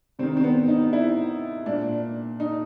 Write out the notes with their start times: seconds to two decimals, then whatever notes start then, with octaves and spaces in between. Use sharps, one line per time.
0.19 C3 C4
0.23 D#3
0.37 C4
0.44 B3
0.68 D#4
0.93 E4
1.66 A#2 D4
2.40 D#4